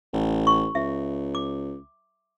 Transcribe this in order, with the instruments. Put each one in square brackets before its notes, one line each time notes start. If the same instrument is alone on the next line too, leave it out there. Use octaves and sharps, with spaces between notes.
[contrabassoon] A1
[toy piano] C#6
[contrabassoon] C#2 [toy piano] E5
[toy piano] D6